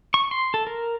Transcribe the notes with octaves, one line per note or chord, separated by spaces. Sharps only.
C#6
C6
A4
A#4